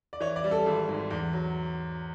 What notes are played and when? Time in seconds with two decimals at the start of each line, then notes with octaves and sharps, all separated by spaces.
0.13 D5
0.20 E3 C#5
0.36 D5
0.44 G3
0.51 A4
0.66 G#1
0.89 G#2
1.11 E2
1.33 F#3